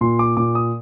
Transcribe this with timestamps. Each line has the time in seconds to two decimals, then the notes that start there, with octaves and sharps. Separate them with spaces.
0.01 A#2 C6
0.19 D6
0.37 A#2 D6
0.55 D#6